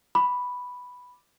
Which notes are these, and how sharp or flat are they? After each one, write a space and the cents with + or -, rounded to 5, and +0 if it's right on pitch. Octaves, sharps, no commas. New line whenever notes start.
B5 +0 D6 +0